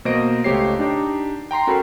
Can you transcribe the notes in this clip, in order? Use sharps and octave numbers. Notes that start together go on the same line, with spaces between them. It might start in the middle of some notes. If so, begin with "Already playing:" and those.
B2 A#3 C5 D#5 A#6 D7
C#2 A3 G4 C5 C#5 C7
D4 D#4 G4
G5 A#5 C6 C7
C#4 F#4 A4 A#4 G5 B5